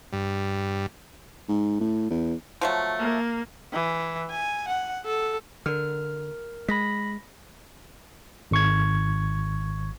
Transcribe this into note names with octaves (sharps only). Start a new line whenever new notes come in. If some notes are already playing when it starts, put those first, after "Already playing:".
G2
G#2
A2
E2
F3 F#3 A3
A#3
E3
G#5
F#5
A4
D3 A#4 F6
G#3 B5 A#6 B6
G#1 C#6 G#6